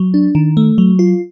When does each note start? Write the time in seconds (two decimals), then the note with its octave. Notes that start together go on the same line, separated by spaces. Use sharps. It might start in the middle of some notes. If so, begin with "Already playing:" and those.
Already playing: F#3
0.14 D4
0.35 D#3
0.57 A3
0.78 F#3
0.99 F4